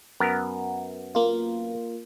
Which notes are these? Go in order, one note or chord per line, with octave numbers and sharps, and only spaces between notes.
F#2 B3 A#4
A#3 F4